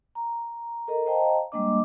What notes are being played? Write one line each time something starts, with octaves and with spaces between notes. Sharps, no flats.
A#5
A4 A#4 D#5 A#5
C5 D#5 F5 G5 A5 A#5
G3 G#3 A#3 D4 D#5 D6